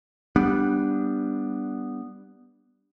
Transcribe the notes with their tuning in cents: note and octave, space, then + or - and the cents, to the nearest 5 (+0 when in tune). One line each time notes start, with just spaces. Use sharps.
G3 +0 B3 +0 D4 +0